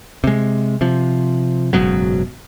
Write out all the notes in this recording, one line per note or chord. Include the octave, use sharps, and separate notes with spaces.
C3 G#3
C3 F3
F#1 G#2 B2 F#3